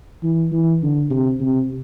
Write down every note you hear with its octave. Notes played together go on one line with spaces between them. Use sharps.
E3
E3
D3
C3
C3